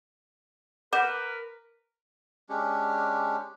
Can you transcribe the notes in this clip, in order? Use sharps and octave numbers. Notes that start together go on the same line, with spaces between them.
A#4 B4 F#5 D6 G6 E7
G#3 C#4 D4 G4